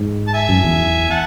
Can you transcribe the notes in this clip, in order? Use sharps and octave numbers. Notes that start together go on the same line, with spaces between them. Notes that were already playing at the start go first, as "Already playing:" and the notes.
Already playing: G#2
A5
E5 G#5
F#2
E2
F#5 A5